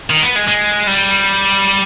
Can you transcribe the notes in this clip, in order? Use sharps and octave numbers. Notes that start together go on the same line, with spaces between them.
D#3
B3
G#3
G#3
G3